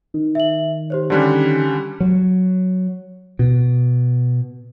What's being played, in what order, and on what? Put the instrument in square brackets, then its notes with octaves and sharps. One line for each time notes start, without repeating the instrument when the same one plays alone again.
[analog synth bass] D#3
[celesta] E5 F#7
G4 C5 C#5
[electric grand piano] D3 G3 C#4 [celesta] C6 F#6
[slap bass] F#3
B2